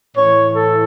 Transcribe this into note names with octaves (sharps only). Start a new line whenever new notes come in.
A2 E3 C#5
A4